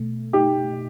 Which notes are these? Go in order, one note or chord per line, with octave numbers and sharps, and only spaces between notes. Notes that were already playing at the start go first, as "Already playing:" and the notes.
Already playing: B2 A3
D#4 G4